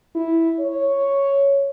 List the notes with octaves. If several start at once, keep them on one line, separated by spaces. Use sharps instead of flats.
E4
C#5